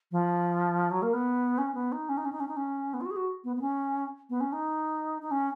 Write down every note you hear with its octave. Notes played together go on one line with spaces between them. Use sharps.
F3
F#3
A#3
B3
C#4
B3
D#4
C#4
D#4
C#4
D#4
C#4
D#4
C#4
B3
F4
F#4
G#4
F#4
B3
B3
C#4
B3
C#4
D#4
D#4
C#4